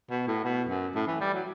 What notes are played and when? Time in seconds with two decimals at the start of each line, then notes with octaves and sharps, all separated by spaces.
0.10 B2
0.27 A2
0.44 B2
0.69 F#2
0.95 A2
1.07 E3
1.20 G3
1.33 F#3